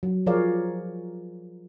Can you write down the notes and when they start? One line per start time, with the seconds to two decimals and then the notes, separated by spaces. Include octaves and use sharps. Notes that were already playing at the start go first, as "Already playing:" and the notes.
0.03 F#3
0.27 F3 G#4 A#4 C#5 D5 F5